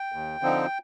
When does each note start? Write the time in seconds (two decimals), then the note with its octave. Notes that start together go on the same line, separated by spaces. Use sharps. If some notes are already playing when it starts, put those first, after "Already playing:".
Already playing: G5
0.12 D#2
0.42 D3 F3 C4 D#4